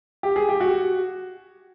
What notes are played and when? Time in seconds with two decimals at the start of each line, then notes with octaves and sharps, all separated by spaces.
0.23 G4
0.36 G#4
0.49 G4
0.60 F#4